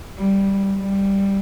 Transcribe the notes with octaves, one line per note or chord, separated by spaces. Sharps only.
G3
G3